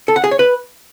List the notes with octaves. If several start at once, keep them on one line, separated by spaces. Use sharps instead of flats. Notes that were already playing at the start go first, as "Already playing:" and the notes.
A4
F#5
G#4
C#5
B4